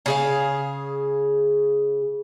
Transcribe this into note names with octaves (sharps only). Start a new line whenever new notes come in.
C#3 G#4 F5